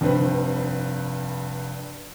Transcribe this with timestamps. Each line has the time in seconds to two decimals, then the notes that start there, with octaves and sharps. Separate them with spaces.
0.01 F1 G2 C4 B4